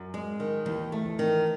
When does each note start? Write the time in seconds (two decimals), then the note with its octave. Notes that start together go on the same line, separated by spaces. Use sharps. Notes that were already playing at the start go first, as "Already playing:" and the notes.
Already playing: F#2
0.14 G#3
0.40 D#3
0.66 D#2 E3
0.92 A3
1.05 E3
1.19 D#3